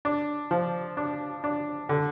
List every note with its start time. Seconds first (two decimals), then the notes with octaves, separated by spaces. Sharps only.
0.05 D4
0.51 F3
0.97 D4
1.44 D4
1.89 D3